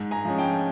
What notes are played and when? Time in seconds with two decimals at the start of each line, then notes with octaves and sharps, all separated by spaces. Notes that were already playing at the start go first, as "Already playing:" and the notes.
Already playing: G#2
0.11 G#5 A#5
0.25 F3 G#3 C#4
0.38 G5 A5